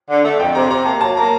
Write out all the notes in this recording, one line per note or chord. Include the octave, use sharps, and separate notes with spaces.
D3
A3
F2 G5
C3 A#5
C3 A#5
A#3 A5
F#3 A5
A#3 A#5